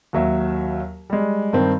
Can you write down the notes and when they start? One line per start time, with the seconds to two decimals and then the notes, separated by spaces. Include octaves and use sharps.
0.13 D#2 F#3 E5
1.10 G3 G#3
1.53 G2 D#3 C4